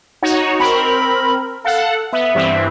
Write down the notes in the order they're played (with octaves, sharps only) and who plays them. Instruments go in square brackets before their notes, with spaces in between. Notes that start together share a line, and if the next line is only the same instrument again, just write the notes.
[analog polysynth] D#4 F#4 C#5
[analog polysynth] C4 A#4 [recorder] B5
[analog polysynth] A4 F#5 [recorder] F5
[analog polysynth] B3 [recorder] E5
[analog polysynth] G2 E3 C4